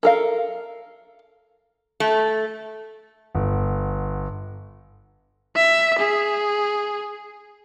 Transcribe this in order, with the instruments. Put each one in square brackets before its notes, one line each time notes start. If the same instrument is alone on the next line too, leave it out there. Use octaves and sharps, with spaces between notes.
[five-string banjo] A4 A#4 F5
[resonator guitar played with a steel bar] A3
[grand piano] G1
[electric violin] E5
G#4